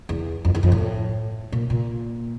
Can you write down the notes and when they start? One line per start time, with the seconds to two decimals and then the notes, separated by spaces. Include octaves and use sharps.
0.09 E2
0.45 F2
0.55 E2
0.63 F2
0.72 A2
1.52 A#2
1.70 A#2